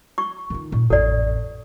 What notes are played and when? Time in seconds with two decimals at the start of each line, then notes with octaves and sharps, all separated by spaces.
0.18 C#6
0.50 D#3 F4
0.72 A#2
0.90 A1 F2 A4 D5